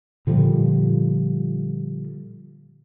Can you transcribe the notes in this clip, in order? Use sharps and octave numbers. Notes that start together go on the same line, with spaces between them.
A#2 D3 F3 G3